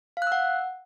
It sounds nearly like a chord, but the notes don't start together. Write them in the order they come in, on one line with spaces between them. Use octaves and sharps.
F5 F#6 E6 F#5